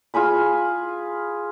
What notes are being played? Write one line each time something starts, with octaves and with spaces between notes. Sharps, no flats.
F4 G#4 G#5 B5